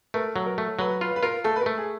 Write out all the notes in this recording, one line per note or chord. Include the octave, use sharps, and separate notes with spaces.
A3 A#4
F#3
A#4
A3
F#3 B4
F4 B4
B4
F4 A#4
A3 A4
B4
A#4
A3
G#4